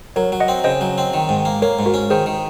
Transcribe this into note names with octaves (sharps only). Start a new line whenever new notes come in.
F#3 A#4 C#5
F#3
D#5 F#5
C4
C#3 C5 D#5
F#3
C4
D#3
G#2
A#3
A#3 A#4 C#5
G#2
F#4 A#4
C#4
D#3 G#4 C5
D#3